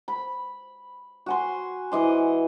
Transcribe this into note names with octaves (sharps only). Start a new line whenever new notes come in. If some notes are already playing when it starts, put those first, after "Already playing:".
B5
F#4 G#5 C6
E3 D#5 C6